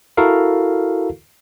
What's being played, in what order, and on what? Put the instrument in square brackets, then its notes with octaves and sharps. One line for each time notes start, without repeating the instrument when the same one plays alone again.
[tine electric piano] E4 F#4 A4 A#4 F5